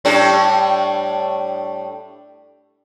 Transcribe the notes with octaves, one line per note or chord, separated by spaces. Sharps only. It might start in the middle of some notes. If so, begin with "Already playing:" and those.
A2 G3 D4